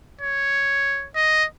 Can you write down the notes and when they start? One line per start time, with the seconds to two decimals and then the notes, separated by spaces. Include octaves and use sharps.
0.21 C#5
1.16 D#5